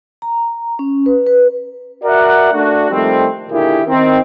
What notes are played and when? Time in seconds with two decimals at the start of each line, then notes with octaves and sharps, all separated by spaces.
0.22 A#5
0.79 C#4
1.06 B4
1.27 B4
2.04 F#4 A#4 D5 E5 F#5
2.53 A3 D4 F#4
2.90 D#3 F3 G3 A3 C4
3.49 A#2 D3 D#3 E4 G4 G#4
3.85 D#3 C4